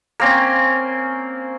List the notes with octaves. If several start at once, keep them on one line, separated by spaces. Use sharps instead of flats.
A#3 C4 C#4